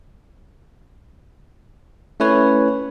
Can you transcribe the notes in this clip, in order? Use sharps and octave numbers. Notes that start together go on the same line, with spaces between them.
A3 C#4 E4 B4 C#5